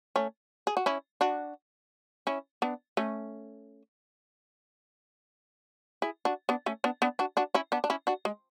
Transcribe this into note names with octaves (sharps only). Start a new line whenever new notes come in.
A3 C#4
G#4
F#4
C#4 E4
D4 F#4
C#4 E4
B3 D4
A3 C#4
E4 G#4
D4 F#4
B3 D4
A3 C#4
B3 D4
B3 D4
D4 F#4
D4 F#4
C#4 E4
B3 D4
D4
C#4 E4
D4 F#4
G#3